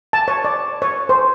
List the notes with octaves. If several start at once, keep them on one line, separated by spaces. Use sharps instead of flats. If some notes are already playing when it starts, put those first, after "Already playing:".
A5
C#5
D5
C#5
C5